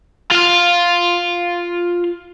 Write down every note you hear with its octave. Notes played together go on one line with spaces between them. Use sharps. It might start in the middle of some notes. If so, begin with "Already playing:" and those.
F4 F5